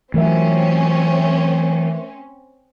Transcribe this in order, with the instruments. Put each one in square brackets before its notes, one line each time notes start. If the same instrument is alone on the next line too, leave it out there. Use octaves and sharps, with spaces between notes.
[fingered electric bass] E3 F#3 [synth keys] A3 A#4 E5 [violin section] C4 C#4